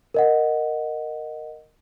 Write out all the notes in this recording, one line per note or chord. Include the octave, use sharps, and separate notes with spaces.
A#4 D#5 F#5